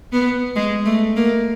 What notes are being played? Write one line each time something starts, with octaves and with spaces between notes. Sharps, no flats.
B3
G#3
A3
A#3